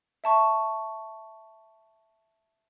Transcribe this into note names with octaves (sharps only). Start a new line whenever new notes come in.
E5 A5 C#6